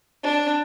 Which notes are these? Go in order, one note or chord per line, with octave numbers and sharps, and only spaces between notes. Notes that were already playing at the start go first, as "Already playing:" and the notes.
D4